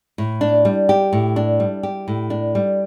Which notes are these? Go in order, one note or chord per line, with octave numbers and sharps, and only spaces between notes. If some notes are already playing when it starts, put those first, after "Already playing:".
A2
D4
G3
G4
A2
D4
G3
G4
A2
D4
G3